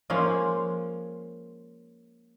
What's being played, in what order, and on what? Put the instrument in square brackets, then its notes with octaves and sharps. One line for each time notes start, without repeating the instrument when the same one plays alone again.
[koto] F3 G#3 A#3 C#4